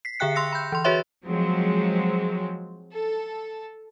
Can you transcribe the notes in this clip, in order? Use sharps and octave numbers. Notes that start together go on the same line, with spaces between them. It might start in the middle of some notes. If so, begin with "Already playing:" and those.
B6 C7
D3 G#4 E5 G5 F#6 C#7
C6 E6 A#6 C#7
B5 G6
E3 C6
F#4 G#4 B4 C#5 E5 C6
F3 F#3 G#3 C4
A4